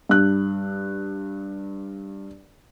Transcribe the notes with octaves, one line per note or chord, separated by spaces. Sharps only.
G2 F#6